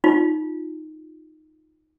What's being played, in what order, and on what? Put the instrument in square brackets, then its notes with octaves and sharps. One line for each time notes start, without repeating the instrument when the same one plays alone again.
[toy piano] D#4 F4